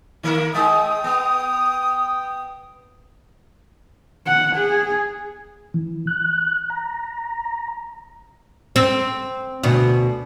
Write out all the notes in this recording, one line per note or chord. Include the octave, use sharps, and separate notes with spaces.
D#3 A#3 A#4
G#3 G5 D#6
B3
F#5
G#4
E3
F#6
A#5
C4
D2 B2